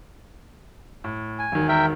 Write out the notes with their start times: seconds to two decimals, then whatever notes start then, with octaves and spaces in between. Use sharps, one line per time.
1.04 A2
1.39 G#5
1.52 E1 D#3
1.68 A#4 E5 G5